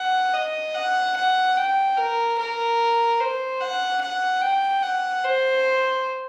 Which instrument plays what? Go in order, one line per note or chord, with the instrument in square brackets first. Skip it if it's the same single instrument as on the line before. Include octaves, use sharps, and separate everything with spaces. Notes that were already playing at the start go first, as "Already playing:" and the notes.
Already playing: [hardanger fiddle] F#5
D#5
F#5
F#5
G5
A#4
A#4
C5
F#5
F#5
G5
F#5
C5